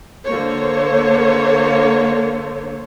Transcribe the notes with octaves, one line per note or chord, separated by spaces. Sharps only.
D3 A#3 C5 C#5